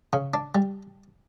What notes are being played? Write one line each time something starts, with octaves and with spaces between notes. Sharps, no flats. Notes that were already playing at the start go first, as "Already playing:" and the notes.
C#3
D4
G3